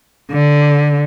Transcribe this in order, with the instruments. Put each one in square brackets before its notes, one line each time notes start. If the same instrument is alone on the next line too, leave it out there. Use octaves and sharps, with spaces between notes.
[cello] D3